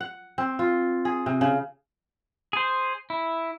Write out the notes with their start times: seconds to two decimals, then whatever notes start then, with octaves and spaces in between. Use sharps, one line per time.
0.01 F#5
0.38 C4
0.59 F4
1.05 G#4
1.26 C3
1.41 C#3
2.53 G#4 C5
3.10 E4